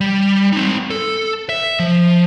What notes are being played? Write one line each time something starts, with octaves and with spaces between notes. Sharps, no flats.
G3
C4 D#4
A4
E5
F3